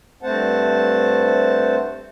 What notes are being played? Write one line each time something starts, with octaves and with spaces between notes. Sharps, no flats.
G2 A3 C4 C5 F#5 A5